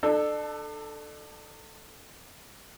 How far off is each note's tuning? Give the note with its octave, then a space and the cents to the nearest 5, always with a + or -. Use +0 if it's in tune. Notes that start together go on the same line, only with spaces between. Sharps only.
D4 +35 A4 +0